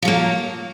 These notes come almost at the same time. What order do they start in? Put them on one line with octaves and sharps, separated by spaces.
F3 F#3 A#3